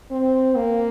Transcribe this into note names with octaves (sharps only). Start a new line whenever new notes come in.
C4
A#3